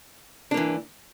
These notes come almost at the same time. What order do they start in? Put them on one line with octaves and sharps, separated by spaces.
D4 A#3 E3